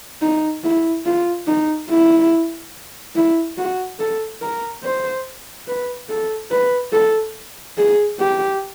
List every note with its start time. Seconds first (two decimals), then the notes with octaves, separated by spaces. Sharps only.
0.22 D#4
0.64 E4
1.06 F4
1.47 D#4
1.90 E4
3.15 E4
3.57 F#4
4.00 A4
4.42 A#4
4.84 C5
5.67 B4
6.09 A4
6.51 B4
6.93 A4
7.78 G#4
8.20 G4